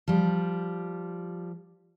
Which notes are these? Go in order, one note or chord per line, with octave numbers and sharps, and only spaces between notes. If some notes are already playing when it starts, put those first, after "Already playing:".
F3 G3